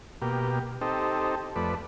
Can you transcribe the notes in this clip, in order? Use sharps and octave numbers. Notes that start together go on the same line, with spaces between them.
B2 A#3 G4
C4 D#4 G4 A4
F2 A3 B4 D5